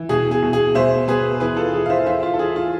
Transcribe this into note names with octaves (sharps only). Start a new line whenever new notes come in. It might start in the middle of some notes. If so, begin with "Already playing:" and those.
Already playing: E3
B2 G#4
G#4
B2
G#4
B2 C5 E5
B2 G#4 B4
E3 G#4 B4
F4 A4
E3 G#4
F5
C5 E5
E3 C5 E5
F4
A4
E3 G#4
F4